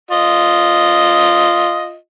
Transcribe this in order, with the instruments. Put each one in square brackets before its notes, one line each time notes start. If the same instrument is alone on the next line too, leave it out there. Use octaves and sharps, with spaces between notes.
[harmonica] F4 D#5